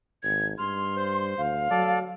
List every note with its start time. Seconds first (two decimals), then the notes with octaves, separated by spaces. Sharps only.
0.23 G#1 G#6
0.58 G2 C6 F6
0.96 C5
1.38 D2 F5
1.71 F#3 A4 D5